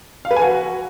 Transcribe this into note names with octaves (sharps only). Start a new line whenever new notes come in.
F5
B4
G#5
F#4